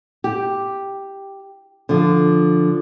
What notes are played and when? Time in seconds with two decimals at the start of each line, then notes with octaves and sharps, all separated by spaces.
0.24 G4
1.89 D3 F3